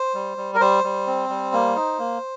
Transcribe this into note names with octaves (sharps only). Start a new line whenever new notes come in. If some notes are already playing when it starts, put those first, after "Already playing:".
Already playing: C5
G3
G3
A#4
G3 C5
G3
C4
G3
A#3
D#4
A#3